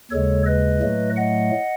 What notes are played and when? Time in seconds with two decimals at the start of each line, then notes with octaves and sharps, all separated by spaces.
0.11 D#2 C#3 G#3 A4 C#5
0.46 B4 D#5
0.81 A2 F#3 A3
1.17 D#5 F#5